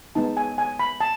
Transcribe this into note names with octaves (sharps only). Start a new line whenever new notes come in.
G#3 B3 D#4 A5
G#5
G#5
B5
A5